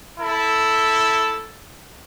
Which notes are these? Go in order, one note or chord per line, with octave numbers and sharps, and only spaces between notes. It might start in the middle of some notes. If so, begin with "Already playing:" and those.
E4 A4